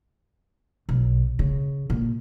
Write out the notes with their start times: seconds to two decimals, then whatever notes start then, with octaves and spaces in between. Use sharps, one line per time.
0.89 B1
1.39 C#3
1.90 A#2